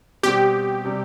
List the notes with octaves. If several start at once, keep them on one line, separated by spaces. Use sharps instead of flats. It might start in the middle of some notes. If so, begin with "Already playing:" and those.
B2 G3 C4 G4
C3 G3